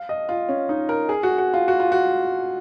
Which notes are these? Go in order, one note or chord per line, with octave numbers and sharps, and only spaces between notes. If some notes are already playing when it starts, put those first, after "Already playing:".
Already playing: F5
D#5
F4
C#4
D#4
A#4
G#4
F#4
F#4
F4
F#4
F4
F#4